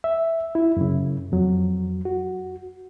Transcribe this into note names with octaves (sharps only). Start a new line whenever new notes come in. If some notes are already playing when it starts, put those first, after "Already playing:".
E5
E4
F#2 C#3
F2 F#3
F#4